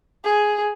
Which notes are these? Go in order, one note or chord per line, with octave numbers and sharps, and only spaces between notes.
G#4